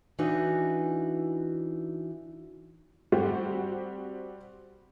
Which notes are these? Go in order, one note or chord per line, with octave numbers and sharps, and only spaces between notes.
E3 D4 D#4 F#4 B4
G3 C4 F#4 G4